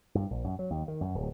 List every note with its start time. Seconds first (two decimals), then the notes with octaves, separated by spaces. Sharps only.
0.15 G2
0.31 A#1
0.44 F#2
0.59 F#3
0.70 D#2
0.88 D#3
1.01 F#2
1.15 D1